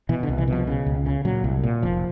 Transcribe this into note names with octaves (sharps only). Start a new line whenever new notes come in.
B2 E3
D3
C2
E3
B2 F3
C#3
C#2
C#3
A#2 F#3
C2
A#2
F1 F3